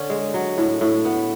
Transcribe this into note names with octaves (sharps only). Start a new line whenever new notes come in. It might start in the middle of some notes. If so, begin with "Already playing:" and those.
Already playing: D3 C#4
G#3
F#3
A2
A2
B3